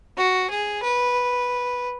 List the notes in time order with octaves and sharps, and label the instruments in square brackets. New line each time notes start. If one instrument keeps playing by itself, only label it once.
[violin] F#4
G#4
B4